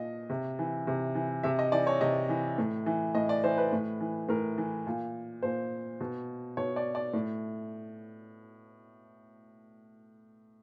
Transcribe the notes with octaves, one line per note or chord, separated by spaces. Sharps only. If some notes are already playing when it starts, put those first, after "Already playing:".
Already playing: A#2 D#5
C3
E3
C3
E3
C3 E5
D#5
E3 D5
C#5
C3 D#5
E3
A2
E3
A2 D#5
D5
E3 C5
B4
A2
E3
A2 A#4
E3
A#2
A#2 C5
B2
B2 C#5
D5
D5
A2